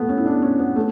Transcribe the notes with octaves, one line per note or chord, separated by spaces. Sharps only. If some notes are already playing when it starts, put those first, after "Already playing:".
Already playing: A3 B3
C#4
E4
D4
C#4
B3
A3